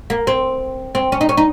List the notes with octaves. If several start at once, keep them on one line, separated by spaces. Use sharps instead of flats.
A#3
C4
C4
C#4
D#4
C#4
D#4